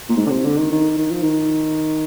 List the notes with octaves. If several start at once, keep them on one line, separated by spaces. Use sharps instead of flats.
A#2
G#2
D3
C3
D3
D#3
D#3
D#3
F3
D#3